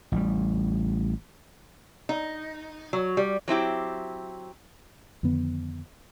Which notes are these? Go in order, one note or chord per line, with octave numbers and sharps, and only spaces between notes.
A1 G3
D#4
F#3
G3
F#3 C4 E4 G4
F2 D3 D#3 B3